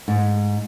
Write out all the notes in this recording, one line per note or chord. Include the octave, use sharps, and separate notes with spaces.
G#2